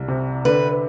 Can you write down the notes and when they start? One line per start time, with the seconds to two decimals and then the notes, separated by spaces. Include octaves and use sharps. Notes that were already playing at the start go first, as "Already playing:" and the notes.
Already playing: C2
0.08 C3
0.45 D3 B4